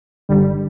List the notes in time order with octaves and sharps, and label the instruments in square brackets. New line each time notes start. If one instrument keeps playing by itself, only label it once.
[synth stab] G1 G2 D3 G3